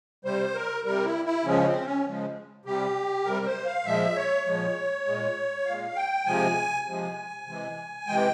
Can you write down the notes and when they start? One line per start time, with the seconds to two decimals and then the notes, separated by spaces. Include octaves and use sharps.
0.25 C3 G3 C5
0.55 A#4
0.85 C3 G3 A#4
1.05 E4
1.25 E4
1.45 C#3 F3 G#3 C#4
1.65 C4
1.85 C#4
2.05 C#3 F3 G#3
2.65 C3 G3 G4
3.26 C3 G3 A#4
3.46 C5
3.66 F5
3.86 A#2 F3 G#3 E5
4.16 C#5
4.46 A#2 F3 G#3
5.06 A#2 G#3
5.66 A#2 G#3 F5
5.96 G5
6.26 C3 F3 G#3 G#5
6.86 C3 F3 G#3
7.46 C3 E3 G#3
8.07 C3 E3 G#3 G5